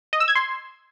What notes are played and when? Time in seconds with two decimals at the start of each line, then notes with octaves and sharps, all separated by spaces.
0.13 D#5
0.20 E6
0.28 G#6
0.35 C6